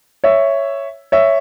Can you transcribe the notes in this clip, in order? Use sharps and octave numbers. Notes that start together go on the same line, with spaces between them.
C#5 E5
C#5 E5